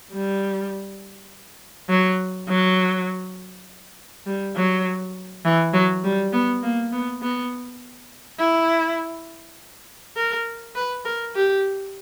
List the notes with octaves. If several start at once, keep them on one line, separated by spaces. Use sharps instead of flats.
G3
F#3
F#3
G3
F#3
E3
F#3
G3
B3
A#3
B3
B3
E4
A#4
B4
A#4
G4